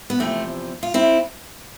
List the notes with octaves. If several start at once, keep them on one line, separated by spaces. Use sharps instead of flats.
B3
E2 C3 F3 A3 C4
F4
C4 E4